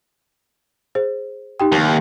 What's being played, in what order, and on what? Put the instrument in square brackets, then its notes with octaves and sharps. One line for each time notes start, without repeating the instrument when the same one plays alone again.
[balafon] G#4 C5
D#4 G4 G5
[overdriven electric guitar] D#2